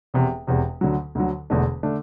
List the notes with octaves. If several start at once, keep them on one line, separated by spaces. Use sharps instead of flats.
E1 E2 C3
E1 E2 C3
D2 D3 F#3
D2 D3 F#3
E1 E2 D3 A3 D4
D3 A3 D4